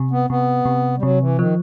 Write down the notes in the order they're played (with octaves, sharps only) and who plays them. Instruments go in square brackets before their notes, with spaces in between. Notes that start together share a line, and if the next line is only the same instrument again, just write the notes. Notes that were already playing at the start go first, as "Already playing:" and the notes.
Already playing: [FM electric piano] C3
[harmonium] B3
[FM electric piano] C3 [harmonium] B3
[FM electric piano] C3
[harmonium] G3
[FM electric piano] C3 [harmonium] F#3
[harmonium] E3
[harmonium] D#3 [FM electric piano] F3